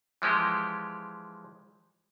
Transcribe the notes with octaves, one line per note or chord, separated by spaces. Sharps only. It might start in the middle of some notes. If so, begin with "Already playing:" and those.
E3 F3 G#3 G4